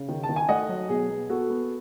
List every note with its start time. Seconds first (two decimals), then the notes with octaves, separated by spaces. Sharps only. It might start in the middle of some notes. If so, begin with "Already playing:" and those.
Already playing: C#3
0.09 D#3
0.23 A5
0.29 D#3
0.36 G#5
0.49 A3 D#5 F#5
0.69 F#3
0.89 B2 G#4
1.09 B3
1.30 B3 F#4 A4
1.50 B3